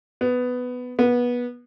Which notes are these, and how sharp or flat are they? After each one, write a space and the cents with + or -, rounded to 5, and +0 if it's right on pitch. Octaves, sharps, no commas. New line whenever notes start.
B3 +10
B3 -20